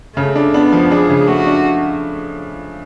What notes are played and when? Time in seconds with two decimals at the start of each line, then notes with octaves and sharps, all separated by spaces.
0.16 C#3 A3
0.35 D4
0.54 B3 D4
0.72 F3
0.91 D4 G#4
1.10 C#3
1.27 A3 F#4
1.47 D4